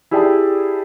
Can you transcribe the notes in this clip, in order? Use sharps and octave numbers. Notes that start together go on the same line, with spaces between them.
E4 G4 G#4 D5 G5 A5